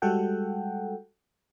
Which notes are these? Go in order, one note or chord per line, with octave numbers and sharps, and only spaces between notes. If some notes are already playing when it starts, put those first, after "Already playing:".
G3 G#3 F#4 A4 F#5 G5